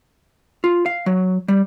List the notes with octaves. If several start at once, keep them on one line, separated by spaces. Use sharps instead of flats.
F4
F5
F#3
G3